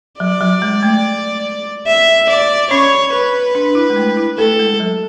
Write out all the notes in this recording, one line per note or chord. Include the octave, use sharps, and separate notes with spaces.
F#3 D5
F#3
G#3
A3
E5
D5
C#4 C#5
B4
D4
E4
G#3
A3
E4
A3 A4
G#3
F#3